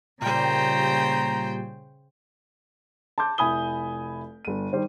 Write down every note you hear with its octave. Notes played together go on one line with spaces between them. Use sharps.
A#2 C#3 G3 C5 G5 A#5
A5 C6 D6 G6
F1 E4 G#5 B5 D#6 G7
G1 D#7
D#3 G3 C5